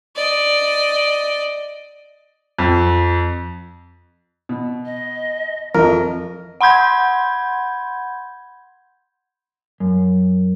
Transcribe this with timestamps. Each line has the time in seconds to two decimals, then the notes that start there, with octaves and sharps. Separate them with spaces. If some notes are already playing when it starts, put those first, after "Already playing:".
0.16 D5 D#5
2.58 F2
4.49 B2
4.86 D#5
5.75 F2 F3 A#4 D#5
6.61 F#5 B5 C6 G6 G#6
9.80 F#2